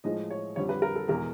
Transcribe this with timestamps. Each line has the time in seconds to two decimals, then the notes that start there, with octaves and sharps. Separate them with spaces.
0.04 A2 F3 G#3 D#5
0.30 C#5
0.56 F2 D3 G3 C#5
0.69 B4
0.82 A#4
0.96 A4
1.08 E2 B2 G#3 A#4